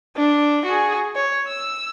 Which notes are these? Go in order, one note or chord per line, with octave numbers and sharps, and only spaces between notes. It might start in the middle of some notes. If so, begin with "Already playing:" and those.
D4
F#4 G#4
C#5
E6